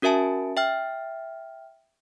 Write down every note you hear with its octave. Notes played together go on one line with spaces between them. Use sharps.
C#4 F#4 A#4 E5 G#5 A5
E5 G5 F6